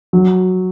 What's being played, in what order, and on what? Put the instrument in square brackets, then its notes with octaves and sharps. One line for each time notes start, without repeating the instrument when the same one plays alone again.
[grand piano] F#3